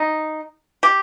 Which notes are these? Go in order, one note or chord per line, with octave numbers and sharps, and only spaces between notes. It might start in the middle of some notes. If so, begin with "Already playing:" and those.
Already playing: D#4
G4